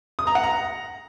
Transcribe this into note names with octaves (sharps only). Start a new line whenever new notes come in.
D#6
A#5
F#5
A#5